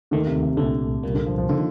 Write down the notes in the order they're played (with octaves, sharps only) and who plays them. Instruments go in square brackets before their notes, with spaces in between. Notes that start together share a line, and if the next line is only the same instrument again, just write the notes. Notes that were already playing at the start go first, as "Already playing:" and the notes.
[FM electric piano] D#2 D#3 A3 [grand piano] D3
[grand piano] C3
C3
[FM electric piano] C2 A#2 A3 [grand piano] D3
[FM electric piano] C2 A#2 G3 A#3
[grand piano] D3
F3
F3
[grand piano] D3 [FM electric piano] D#3 A#3 F4